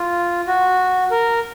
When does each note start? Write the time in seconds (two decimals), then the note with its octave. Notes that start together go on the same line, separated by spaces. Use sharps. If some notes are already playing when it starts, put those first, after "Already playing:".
Already playing: F4
0.47 F#4
1.11 A#4